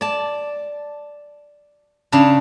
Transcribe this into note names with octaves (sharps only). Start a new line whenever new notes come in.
D5 A5
C#3 D4